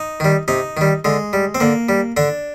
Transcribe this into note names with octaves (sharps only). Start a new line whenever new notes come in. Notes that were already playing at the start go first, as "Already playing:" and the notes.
Already playing: D#4
D#3 G3
C3 D#4
D#3 G3
D3 G#3
G3
C4
D3 A#3
G3
D3 D4